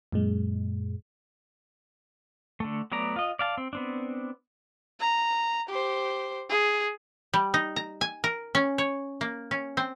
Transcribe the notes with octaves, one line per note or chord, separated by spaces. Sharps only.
F#2 A#2 G#3
D3 A3
F#3 A3 B3 D5 A#5
F4 D#5
D5 F5 A5
C4
B3 C4 D4
A#5
G4 C5
G#4
G3
D#4
A#5
G#5
A#4
C#4
C#5
A#3
C#4
C4